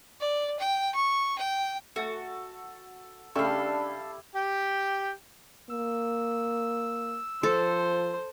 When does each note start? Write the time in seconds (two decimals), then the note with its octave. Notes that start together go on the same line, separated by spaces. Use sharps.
0.20 D5
0.59 G5
0.95 C#6
1.38 G5
1.96 A3 F#4 A4 A5
3.35 C#3 G3 A3 D4 E4 A4 F5 C#6
4.35 G4 G5
5.70 A#3 E6
7.43 F3 A4 C5